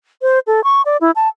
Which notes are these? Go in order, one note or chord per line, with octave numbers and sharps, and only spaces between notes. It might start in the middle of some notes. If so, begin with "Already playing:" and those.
C5
A4
C#6
D5
E4
A5